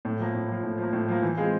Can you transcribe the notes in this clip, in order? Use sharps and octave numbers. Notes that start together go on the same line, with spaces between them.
A2
F3 A#3
A2
F3 A#3
A2
F3 A#3
A2
F3 A#3
E3
G#3 C4 F4 G#4